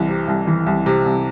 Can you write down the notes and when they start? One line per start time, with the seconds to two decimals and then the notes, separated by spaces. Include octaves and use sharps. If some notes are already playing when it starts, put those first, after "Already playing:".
Already playing: C2 E3
0.08 C3
0.28 C2
0.47 E3
0.66 C2
0.86 C3
1.06 C2